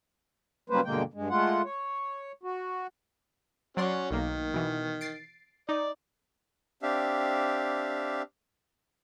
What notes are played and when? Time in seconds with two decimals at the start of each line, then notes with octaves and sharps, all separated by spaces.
0.70 C#3 F#3 G3 A#3 B4 C5
0.85 G2 B2 D3 G#3 A#3 G5
1.14 G2 G#3
1.30 G#3 A3 F4 F#5
1.65 C#5
2.43 F#4
3.77 F#3 C#4 F#4 D5 C6
4.11 B1 D#3 A#3
4.54 B2 E3
5.01 A6 C7 D7
5.69 D#4 D5
6.82 C4 D4 G4 E5 F5